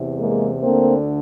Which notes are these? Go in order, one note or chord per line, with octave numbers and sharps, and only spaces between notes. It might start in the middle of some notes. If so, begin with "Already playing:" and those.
Already playing: E2 C3 E3
G#3 A#3
D2 D3 A#3 C4